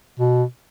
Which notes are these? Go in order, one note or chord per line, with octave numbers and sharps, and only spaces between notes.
B2